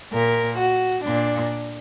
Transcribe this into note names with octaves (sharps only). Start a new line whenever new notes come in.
A#2 A#4
F#4
A#2 D4